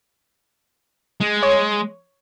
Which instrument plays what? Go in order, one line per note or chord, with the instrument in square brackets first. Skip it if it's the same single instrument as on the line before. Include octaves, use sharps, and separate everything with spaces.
[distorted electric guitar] G#3
[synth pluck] C#5